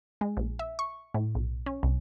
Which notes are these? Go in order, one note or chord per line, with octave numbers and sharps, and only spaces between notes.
G#3
A#1
E5
C#6
A2
B1
C#4
C2